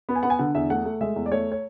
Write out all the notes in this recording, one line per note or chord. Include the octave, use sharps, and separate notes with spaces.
B3
G#5
B3 F#5
G#5
D3 F#5
E2 E5
A3 F#5
A3
G#3 E5
E2
D5
A3 C#5
C#5